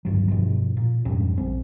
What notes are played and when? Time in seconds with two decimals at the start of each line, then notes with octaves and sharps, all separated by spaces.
0.05 G1 D2 G2 F#3
0.29 G2 B2 F3
0.77 A#2
1.05 F2 G#2 G3 C#4
1.37 A#1 C4